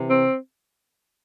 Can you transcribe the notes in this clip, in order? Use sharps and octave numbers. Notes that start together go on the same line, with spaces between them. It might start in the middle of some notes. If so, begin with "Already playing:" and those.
Already playing: C3 E3
C4